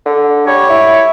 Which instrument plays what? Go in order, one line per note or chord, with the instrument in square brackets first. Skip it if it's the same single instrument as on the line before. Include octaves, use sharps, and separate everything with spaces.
[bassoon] D3
[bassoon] G3 [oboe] C#5
[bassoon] E4